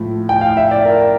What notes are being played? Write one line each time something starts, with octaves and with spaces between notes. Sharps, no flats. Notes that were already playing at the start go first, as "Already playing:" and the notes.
Already playing: A2 F3
G5
F5
E5
D5
A#4